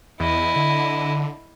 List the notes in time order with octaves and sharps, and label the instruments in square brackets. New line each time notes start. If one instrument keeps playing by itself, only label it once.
[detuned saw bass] E2 [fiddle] E4 D#5
[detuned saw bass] D3